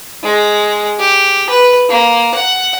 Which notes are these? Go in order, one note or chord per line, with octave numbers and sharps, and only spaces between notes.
G#3
G4
B4
A#3
F#5